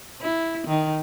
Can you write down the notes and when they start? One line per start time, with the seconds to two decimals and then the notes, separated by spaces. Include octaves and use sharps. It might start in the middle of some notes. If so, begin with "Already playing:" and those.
0.22 E4
0.67 D#3